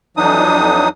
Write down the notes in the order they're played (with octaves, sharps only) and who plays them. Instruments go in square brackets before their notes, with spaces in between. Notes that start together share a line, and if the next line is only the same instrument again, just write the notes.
[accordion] F2 E3 F#3 D4 D#4 D#6